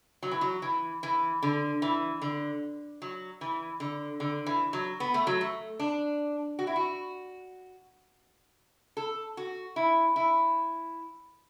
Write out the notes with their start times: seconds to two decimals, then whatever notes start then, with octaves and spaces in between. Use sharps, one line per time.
0.23 F#3
0.31 E3
0.41 F#3
0.62 E3
1.03 E3
1.42 D3
1.82 E3
2.22 D3
3.02 F#3
3.41 E3
3.80 D3
4.20 D3
4.46 E3
4.73 F#3
5.00 B3
5.14 A3
5.27 F#3
5.41 A3
5.79 D4
6.59 F#4
6.67 E4
6.76 F#4
8.97 A4
9.37 F#4
9.76 E4
10.16 E4